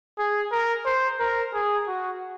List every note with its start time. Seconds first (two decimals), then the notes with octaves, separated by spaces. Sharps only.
0.19 G#4
0.52 A#4
0.86 C5
1.20 A#4
1.54 G#4
1.87 F#4